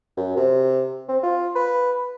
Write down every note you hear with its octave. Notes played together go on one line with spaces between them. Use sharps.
F#2
C3
C4
F4
B4